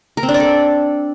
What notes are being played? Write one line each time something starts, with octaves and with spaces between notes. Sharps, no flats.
A#4
C4
D4
D5
A4